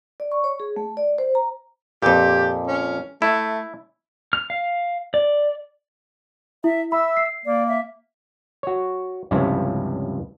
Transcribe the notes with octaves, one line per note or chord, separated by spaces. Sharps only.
D5
C#6
C#5
G#4
A3
D5
C5
A#5
F2 A#2 G4
C#4
A3 E4
F6
F5
D5
E4 E5
E5 B5 E6
C7
A#3 D5
E5
F#4 C#5
C#2 G2 C3 F3 C#4 E4